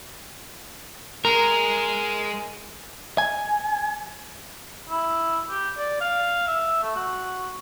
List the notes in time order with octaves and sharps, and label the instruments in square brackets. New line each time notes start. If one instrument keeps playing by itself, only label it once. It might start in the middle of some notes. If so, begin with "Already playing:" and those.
[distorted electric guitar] G#3 [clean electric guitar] A#4
[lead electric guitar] G#5
[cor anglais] E4
G4
D5
F5
E5
A3
F#4